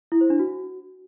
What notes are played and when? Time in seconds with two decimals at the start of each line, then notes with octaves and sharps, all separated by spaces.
0.12 E4
0.21 C5
0.30 D4
0.39 F#4